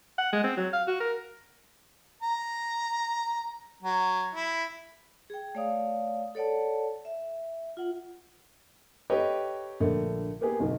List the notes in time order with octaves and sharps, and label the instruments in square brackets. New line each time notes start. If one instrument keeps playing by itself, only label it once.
[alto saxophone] F#5
G#3
C4
F#3
F5
F#4
A#4
[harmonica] A#5
F#3
E4
[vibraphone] G#4 G5
A3 C#5 D5 F5 D#6
A4 C#5 D5 F#5 A5
E5
F4 F#5
[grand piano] G4 A4 B4 C#5 D#5 G5
A#1 D3 A3 A#3
A#3 B3 G4 G#4
D1 B1 D#5